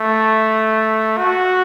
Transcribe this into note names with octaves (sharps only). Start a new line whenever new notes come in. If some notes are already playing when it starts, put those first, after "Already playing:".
Already playing: A3
F#4